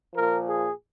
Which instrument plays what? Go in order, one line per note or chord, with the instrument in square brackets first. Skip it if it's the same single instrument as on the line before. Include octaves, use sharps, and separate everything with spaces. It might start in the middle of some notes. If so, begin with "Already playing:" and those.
[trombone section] A#2 F3 A#4
G#4